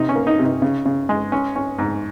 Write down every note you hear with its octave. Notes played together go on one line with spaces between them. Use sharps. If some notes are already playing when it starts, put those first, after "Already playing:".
Already playing: C3 D#4
C#4
A#3
D#4
C3
D#4
C#3
C#3
G#3
C#4
C#4
G#2